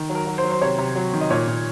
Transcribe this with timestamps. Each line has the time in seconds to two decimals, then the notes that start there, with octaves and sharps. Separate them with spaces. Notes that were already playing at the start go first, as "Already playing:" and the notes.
Already playing: D#3
0.10 F#3
0.15 A#4
0.27 F#3
0.38 C5
0.44 F#3
0.51 C5
0.61 C3 C#5
0.78 C3
0.96 F#3
1.13 D#3
1.21 D#5
1.30 A#2 C#5
1.48 A#2